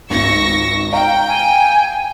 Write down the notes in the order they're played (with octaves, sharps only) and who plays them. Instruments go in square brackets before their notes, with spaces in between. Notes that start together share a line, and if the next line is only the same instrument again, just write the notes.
[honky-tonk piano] G#1 C#2 [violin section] C#6 E6 A#6
[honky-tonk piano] F5 A#5 [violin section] G5
[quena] G#5